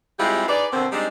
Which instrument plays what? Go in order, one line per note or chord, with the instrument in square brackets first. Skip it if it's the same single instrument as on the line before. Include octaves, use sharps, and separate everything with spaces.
[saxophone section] G3 G#3 C4 E4 F4 G4
D#4 G#4 B4 D5
B2 D3 A#3 C4
G3 G#3 C4 D4 D#4